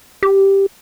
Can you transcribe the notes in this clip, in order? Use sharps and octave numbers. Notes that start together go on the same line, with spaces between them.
G4